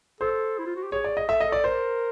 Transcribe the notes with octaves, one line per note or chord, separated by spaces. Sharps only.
A4 C5
E4
F4
F#4
G4
G#4 C#5
D5
D#5
A4 E5
D#5
A4
D5
A#4 C5